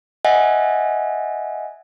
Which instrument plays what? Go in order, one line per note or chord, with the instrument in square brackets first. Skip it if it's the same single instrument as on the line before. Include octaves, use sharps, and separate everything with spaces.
[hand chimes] D#5 E5 F#5 G#5